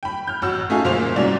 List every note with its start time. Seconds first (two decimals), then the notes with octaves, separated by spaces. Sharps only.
0.03 G5 B5
0.27 F6 G6
0.42 A1 F#4 E6
0.70 A3 C#4 D#4 F4 G#4
0.84 G1 A#2 A#3 F4 C5 F7
1.16 C2 G#2 F#3 C#4 D5 F7